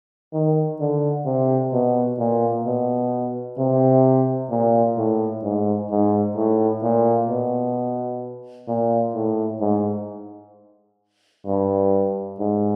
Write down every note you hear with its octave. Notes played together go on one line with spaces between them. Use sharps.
D#3
D3
C3
B2
A#2
B2
C3
A#2
A2
G#2
G#2
A2
A#2
B2
A#2
A2
G#2
G2
G#2